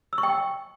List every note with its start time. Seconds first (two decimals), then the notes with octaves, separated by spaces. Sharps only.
0.13 E6
0.18 C#6
0.23 G5